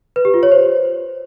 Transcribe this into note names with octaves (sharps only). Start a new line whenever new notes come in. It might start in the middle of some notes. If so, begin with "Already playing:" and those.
B4
G4
F4
C#5
C5